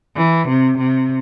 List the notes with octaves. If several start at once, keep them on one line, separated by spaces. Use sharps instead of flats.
E3
C3
C3